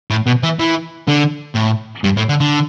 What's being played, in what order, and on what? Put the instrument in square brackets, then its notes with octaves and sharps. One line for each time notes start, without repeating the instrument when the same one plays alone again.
[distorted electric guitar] A2
B2
E3
E3
D3
A2
G2
A2
D3
D3